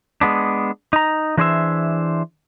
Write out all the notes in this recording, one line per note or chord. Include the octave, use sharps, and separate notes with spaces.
G#3 B3 D4
D#4 A#5
E3 D4 G#4 C5 D5 E5